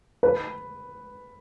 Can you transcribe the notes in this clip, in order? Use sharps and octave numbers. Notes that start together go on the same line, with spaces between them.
B4